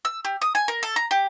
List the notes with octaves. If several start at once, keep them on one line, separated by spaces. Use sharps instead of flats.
E6
G4
D#6
G#5
A#4
A4
A#5
G4